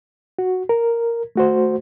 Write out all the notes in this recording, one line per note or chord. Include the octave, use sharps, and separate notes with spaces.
F#4
A#4
A3 F#4 C5